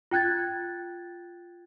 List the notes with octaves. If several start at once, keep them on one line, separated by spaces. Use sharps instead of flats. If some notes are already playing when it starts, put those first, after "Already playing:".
F4 G5 F#6 G#6 A6